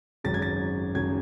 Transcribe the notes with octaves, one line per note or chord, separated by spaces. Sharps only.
G#1 F#2 C#3 A6
G#6
A6
G#1 F#2 C#3 G#6